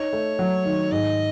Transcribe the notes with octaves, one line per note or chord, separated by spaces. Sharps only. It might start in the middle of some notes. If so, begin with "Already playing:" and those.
Already playing: D#4 C#5
A3
F#3
D#3
G#2 D#5